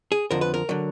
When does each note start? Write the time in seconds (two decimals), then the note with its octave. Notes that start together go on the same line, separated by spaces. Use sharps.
0.12 G#4
0.31 F2 D3 F3 A#4
0.41 B4
0.54 A#4
0.69 D3 F#3